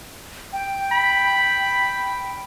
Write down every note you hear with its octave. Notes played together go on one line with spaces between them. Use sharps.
G5
B5